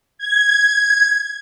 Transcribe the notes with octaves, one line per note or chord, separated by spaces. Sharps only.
G#6